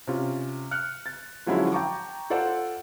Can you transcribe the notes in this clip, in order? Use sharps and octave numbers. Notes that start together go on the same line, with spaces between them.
C3 C#4 F4
F6 F#6 C#7
A6
D3 F3 F#3 G#3 C#4 E4
G5 A5 A#5 C#6 D6
F4 A4 C5 D5 F#5